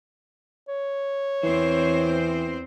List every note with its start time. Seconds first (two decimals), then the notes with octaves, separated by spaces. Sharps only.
0.68 C#5
1.43 E2 E3 C4 C5